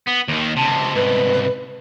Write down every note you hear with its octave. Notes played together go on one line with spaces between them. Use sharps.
B3
D#2 D#3
C#2 C3 A5
C2 G#2 B4